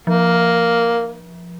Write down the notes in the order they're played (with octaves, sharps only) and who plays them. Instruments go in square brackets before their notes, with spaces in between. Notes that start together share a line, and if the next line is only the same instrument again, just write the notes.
[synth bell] F3 [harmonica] A#3